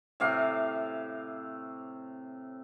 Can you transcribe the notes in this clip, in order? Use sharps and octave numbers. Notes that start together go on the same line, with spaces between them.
A2 C3 F5 D6